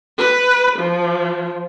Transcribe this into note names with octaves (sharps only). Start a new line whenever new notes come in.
B4
F3